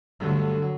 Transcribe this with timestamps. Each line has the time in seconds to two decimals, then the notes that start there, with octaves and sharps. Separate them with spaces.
0.20 G2 D3 F#3 A3
0.62 F#3